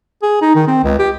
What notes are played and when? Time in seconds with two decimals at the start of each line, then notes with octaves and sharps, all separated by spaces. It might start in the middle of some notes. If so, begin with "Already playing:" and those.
0.23 G#4
0.42 D#4
0.55 D#3
0.68 C4
0.84 C#2
0.99 G4